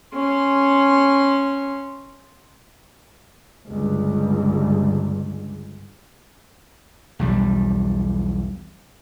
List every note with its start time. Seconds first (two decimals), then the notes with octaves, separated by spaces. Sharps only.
0.14 C#4 C6
3.67 G1 C#2
7.19 B1 E2 G3